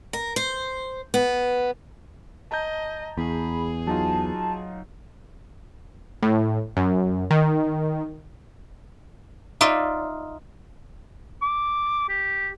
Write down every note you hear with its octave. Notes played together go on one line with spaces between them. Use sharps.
A#4
C5
B3
D#5 A5 A#5 G6
E2 G#4 B5
F#3 D#4 F4 A5
A2
F#2
D#3
D#4 F4 D5 E5
D6
G4